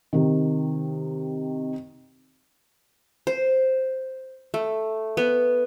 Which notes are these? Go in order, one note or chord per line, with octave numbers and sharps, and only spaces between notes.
C3 D#3
C5
A3
B3